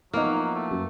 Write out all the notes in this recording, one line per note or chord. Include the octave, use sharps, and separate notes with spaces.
F3 F#3 A#3 B3 D#4 E4 F6
A3
F#2